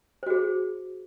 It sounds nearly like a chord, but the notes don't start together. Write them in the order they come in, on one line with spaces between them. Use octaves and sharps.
C5 F#4 G#4